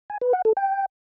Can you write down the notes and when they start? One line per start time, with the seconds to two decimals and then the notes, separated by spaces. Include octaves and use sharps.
0.10 G#5
0.21 B4
0.33 F#5
0.45 A4
0.57 G5